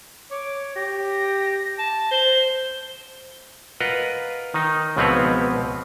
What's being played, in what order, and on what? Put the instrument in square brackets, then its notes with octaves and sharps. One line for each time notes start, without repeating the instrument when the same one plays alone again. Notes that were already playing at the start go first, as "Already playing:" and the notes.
[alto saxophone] C#5 [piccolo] D6
[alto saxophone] G4 [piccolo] A#6
[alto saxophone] A5
[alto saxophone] C5 [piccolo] G7
[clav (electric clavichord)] F4 A#4 B4 D#5 F#5
D#3 D#4
C#2 B2 F3 C4 B4 C#5